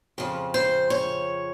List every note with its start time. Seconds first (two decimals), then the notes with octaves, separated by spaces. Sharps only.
0.18 F2 C#3 F3
0.54 C5
0.90 C#5